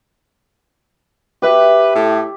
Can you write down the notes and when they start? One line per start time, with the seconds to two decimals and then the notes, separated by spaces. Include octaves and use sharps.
1.42 G4 B4 E5
1.95 A2